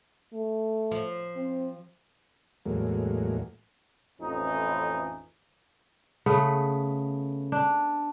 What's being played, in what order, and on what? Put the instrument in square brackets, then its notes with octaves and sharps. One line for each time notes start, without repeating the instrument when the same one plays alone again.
[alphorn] A3
[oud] F3
[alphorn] C4
[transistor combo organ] E2 A2 F#3 G#3 A#3
[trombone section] A1 F2 E3 C#4 D#4
[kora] C#3 A3 B3
D4